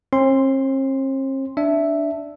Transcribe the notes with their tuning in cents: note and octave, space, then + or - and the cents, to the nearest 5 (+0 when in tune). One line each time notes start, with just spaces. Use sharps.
C4 +45 C6 +0
D4 +0 E5 +0